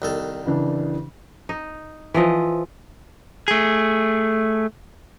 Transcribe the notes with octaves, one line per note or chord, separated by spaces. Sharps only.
C2 D#3 A4
C#3 E3 D4
D#4
E3 F3 D#5
A3 G#4